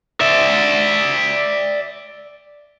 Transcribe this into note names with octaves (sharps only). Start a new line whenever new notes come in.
D5 E5